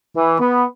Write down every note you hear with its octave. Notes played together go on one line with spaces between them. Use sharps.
E3
B3